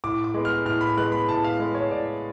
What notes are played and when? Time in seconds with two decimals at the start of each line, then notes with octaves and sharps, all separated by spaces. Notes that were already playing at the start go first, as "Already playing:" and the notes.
0.04 A2 D6
0.24 D6
0.34 G#3 B3
0.45 F6
0.65 A2 F6
0.81 B5
0.97 G#3 B3 F#6
1.12 B5
1.28 A2 A5
1.44 F5
1.59 G#3 B3
1.74 C#5
1.90 A2 D5